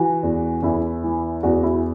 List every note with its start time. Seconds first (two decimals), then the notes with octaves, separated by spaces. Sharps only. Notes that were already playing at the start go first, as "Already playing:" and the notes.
Already playing: E3 F#4
0.23 E2
0.62 E2 E4
1.04 E3
1.43 E2 F#4
1.63 E4